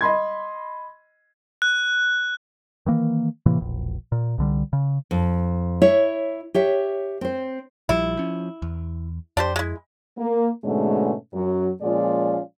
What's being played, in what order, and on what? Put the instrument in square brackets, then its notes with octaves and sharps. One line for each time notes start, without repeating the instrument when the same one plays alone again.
[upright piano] D#5 B5 C6 G#6
[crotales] F#6
[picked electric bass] D#3 E3 A#3
A2 C3 E3 A#3
E1 A#1
A#2
C2 D3 G3
C#3
[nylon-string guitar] F2
E4 C#5 E5
G4 C#5 E5
C4 C5
[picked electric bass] A#1 F3 G3 [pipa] E4
[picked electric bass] F3 C#4
E2
[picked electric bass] F2 [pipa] D4 G4 C5
[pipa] G#3 E4
[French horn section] A#3
G#2 B2 D3 G#3 A3 C#4
F#2 F#3
A#2 F3 G#3 C#4 F4 D5